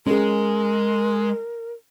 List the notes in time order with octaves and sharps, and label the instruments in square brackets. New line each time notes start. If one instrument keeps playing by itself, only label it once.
[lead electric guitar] G#3 [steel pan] C#4 G#4 [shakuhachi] A#4